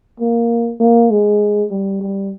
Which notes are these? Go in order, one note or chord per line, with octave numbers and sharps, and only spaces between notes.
A#3
A#3
G#3
G3
G3